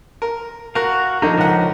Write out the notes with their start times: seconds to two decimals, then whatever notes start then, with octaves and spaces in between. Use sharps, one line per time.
0.22 A#4
0.75 F#4 A#4 F5
1.22 D3 F3 D#4 A#4
1.37 C#2 F#5